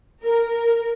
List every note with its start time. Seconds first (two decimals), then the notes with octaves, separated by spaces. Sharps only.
0.23 A#4